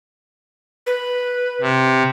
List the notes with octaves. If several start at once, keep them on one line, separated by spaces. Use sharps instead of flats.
B4
C3